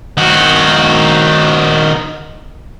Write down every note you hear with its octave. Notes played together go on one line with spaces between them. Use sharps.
D#3 F#4